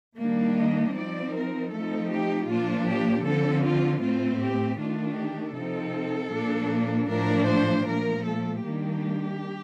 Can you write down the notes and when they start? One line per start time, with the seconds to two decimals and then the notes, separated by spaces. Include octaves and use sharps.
0.18 D#3 G3 A#3 D4
0.57 D#5
0.95 F3 C4 D#4 D5
1.34 A#4
1.72 F3 A3 C4 D#4 A4
2.11 G4
2.48 A#2 F3 A#3 D4 F4
2.88 G4
3.26 D3 F3 C4 A4
3.64 F4
4.02 A2 A3 C4 F4
4.42 G4
4.79 D#3 A3 D4 F4
5.18 G4
5.56 C3 F3 C4 D#4 A4
6.33 A#2 F3 A#3 D4
7.09 A2 F3 A3 D4 A#4
7.48 C5
7.86 A#2 F3 A3 A#4
8.25 A4
8.63 D#3 G3 A#3 D4 G4